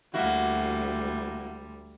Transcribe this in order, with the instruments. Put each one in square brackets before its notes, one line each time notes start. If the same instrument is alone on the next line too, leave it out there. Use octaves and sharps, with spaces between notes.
[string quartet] D2 G3 [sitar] A#3 E4 F#4